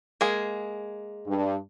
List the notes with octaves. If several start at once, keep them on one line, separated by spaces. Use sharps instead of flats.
G#3 A#3 G#4
G2